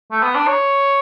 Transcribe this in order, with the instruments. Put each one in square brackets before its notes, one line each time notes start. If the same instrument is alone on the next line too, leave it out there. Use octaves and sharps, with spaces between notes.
[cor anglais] A3
B3
D4
C#5